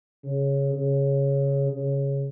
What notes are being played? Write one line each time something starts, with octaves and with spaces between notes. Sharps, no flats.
C#3
C#3
C#3